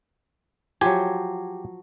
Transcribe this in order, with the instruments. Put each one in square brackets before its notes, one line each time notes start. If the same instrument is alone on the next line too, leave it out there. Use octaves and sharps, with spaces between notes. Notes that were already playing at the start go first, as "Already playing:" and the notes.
[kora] F3 F#3 [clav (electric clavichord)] G4 G#5